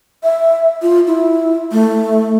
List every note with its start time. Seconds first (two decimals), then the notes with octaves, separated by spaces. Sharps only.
0.23 E5
0.82 F4
1.07 E4
1.72 A3